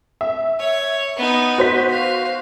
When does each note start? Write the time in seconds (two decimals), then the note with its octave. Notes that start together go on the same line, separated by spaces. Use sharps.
0.21 E5
0.60 C#5
1.16 B3 D#4
1.58 F#4 C5 B6
1.90 F5